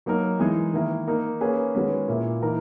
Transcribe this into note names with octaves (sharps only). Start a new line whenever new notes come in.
F#3 A#3 D#4 A#4
E3 G#3 D#4 G#4
D#3 A#3 E4 A#4
A#3 D#4 A#4
A#3 C#4 G#4 B4
D#3 G#3 C#4 F#4 B4
A#2 A#3 E4
E3 A#3 D#4 A#4